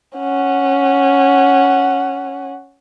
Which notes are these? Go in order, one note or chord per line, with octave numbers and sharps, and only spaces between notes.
C#4 F#5